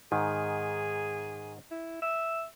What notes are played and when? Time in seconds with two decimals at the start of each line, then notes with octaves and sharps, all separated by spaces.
0.12 G#2 D#3 G#4
1.71 E4
2.02 E5